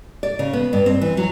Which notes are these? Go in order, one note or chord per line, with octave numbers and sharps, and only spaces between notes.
D5
C#3
B3
G2
C4
E3
F#3